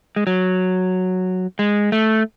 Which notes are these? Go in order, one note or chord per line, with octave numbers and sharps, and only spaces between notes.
G#3
F#3
G#3
A3